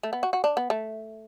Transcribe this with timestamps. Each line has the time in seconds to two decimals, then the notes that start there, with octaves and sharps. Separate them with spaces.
0.03 A3
0.13 B3
0.23 F#4
0.33 F#4
0.44 D4
0.57 B3
0.70 A3